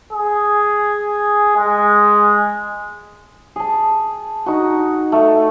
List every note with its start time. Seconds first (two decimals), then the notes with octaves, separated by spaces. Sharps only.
0.12 G#4
1.56 G#3
3.56 G#4 A5
4.46 D#4 F#4
5.12 A3